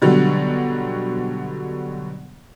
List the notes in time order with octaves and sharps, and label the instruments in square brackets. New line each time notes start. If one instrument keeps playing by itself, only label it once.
[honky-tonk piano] B2 D3 F#3 G3